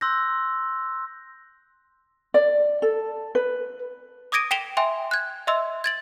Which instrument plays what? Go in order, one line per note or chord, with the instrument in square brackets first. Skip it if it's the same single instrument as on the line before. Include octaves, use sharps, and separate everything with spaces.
[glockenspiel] C6 E6 F#6 G6 A#6
[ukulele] D5
A4
B4
[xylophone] D6 D#6 G#6 A#6 D7 D#7
G5 B6 D7 E7 F7 G7
E5 G5 G#5 C6
F#6 G#6
D#5 E5 C6 E6
G#6 A6 F#7